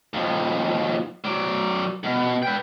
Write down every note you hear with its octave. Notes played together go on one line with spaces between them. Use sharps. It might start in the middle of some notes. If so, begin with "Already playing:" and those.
D#2 F3
F#3 D5
B2
B4 G5